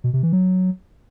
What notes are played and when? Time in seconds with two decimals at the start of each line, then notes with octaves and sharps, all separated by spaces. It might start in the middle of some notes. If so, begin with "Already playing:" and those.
0.04 B2
0.13 C3
0.23 E3
0.33 F#3